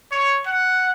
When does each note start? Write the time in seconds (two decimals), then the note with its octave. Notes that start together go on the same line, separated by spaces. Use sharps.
0.11 C#5
0.46 F#5